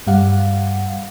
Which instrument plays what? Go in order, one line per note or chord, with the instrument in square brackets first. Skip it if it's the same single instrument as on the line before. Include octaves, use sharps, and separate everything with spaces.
[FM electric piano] G2 G3 F5 F#5